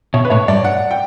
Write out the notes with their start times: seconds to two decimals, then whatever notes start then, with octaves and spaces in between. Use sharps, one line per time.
0.14 B2 C#5
0.25 B4
0.30 A2 C#5
0.48 G2 D5
0.65 F#5
0.91 G5